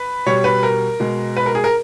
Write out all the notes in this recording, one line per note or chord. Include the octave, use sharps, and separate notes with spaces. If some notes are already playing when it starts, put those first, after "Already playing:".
Already playing: B4
B2 G3 C#5
B4
A#4
B2 G#3
B4
A#4
G#4
A#4